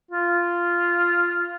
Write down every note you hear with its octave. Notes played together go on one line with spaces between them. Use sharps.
F4